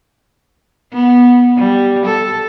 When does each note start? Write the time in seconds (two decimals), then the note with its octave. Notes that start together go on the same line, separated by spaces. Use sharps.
0.93 B3
1.57 G3
2.06 A4